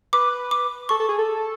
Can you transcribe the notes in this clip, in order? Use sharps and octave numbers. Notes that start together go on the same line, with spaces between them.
B4 D6
D6
A4 C#6
A4
G#4
A4